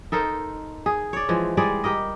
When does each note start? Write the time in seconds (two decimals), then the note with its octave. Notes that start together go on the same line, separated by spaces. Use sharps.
0.12 D#4 A4 A#4 C5
0.86 G#4
1.13 C#5 D5
1.29 E3 F3 G#3
1.57 G3 G#3 G#4 D5
1.84 G4 A#4 D#5